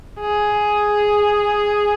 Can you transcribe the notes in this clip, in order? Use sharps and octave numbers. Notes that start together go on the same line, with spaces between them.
G#4